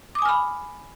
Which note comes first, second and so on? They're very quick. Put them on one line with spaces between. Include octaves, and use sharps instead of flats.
D6 D#6 G#5 F6 B5